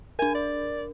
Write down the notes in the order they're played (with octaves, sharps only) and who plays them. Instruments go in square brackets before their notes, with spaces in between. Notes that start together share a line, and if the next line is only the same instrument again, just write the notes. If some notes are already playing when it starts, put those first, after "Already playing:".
[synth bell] D4 A#4 [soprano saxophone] G#5
[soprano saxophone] D5